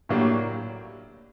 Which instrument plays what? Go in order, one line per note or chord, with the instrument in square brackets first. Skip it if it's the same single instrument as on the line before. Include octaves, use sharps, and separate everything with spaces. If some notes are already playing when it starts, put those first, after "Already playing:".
[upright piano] A2 F#3 A#3 D4 G4